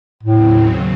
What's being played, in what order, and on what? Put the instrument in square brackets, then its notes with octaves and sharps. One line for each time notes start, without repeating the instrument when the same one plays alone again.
[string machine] D#2 C#3 F#3 C4 [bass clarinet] A2